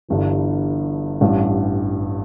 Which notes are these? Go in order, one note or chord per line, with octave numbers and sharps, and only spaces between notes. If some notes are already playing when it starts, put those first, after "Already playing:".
G1 G2 E3
A1 G2 G3